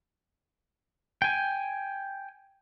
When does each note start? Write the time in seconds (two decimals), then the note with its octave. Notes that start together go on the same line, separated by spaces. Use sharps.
1.22 G5 G#5